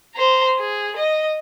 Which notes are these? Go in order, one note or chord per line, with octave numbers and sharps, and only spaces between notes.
C5 A#5
G#4
D#5